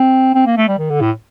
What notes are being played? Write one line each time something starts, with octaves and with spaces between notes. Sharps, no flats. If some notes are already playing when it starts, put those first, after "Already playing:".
Already playing: C4
C4
A#3
A3
G3
D#3
D3
A2